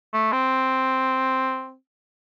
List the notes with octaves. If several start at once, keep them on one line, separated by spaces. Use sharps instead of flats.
A3
C4